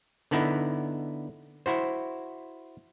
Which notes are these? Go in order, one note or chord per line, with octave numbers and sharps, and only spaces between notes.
D3 B3 D#4 E4
E4 F#4 C5